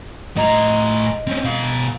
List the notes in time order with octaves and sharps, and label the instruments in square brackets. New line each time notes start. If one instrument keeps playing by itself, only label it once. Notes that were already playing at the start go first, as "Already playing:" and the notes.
[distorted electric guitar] A2 A#5 [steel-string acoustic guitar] D#5
[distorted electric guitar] C4 C#4
B2 F5